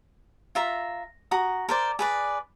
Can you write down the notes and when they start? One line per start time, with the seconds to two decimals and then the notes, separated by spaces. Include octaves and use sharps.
0.55 F4 E5 A#5
1.31 F#4 A#5 D#6
1.69 A#4 C5 D5
1.99 G#4 B4 D5